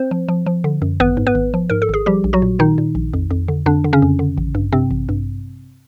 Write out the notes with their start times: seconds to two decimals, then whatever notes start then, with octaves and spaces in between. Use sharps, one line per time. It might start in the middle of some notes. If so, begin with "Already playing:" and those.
Already playing: C4 C5
0.11 F3
0.28 F3
0.46 F3
0.64 D3
0.82 F#2
1.00 G#1 B3 B4
1.17 G#2
1.27 B3 B4
1.35 G#1
1.54 F3
1.70 G#2 A#4
1.82 A4
1.89 G#1 G#4
2.06 F3 G3 G4
2.24 A#1
2.33 F#3 F#4
2.42 A#2
2.59 A#2 D#3 D#4
2.78 A#2
2.95 A#1
3.13 F2
3.31 F2
3.48 D3
3.66 F2 D3 D4
3.84 D3
3.93 C#3 C#4
4.02 F2
4.19 D3
4.37 A1
4.55 G2
4.72 G2 C3 C4
4.91 A1
5.09 G2